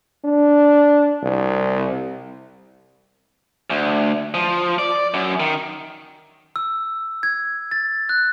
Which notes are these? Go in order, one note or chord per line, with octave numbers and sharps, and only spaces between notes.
D4
C2
D2
F3
D5
F#2
D#3
E6
G#6
A6
F#6